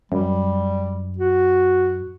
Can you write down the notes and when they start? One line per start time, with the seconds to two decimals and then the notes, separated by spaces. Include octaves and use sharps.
0.12 F#2 G3
1.18 F#4